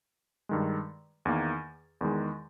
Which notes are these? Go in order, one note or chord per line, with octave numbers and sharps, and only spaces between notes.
G2 D#3 G#3
E2 D#3 A#3
E2 D#3 G#3